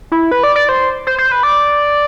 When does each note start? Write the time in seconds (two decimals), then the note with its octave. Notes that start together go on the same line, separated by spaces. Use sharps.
0.12 E4
0.31 B4
0.43 D5
0.56 D5
0.69 C5
1.07 C5
1.18 C5
1.32 B4
1.43 D5